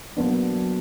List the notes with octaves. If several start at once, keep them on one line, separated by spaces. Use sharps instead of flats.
F#3 A#3 B3 D4
F#3